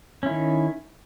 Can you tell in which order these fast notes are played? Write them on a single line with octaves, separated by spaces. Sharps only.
C#4 E4 D#3